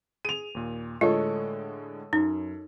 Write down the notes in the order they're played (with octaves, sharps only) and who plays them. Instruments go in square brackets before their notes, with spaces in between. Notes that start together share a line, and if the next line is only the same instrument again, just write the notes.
[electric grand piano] G#4 [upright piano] D#7 F7
[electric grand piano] D#2 A#2
[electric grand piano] A2 D3 G#3 [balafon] F4 [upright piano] A4 C#5 D#5
[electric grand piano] F#2 [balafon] D#4